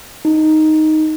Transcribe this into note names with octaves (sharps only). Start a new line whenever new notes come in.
D#4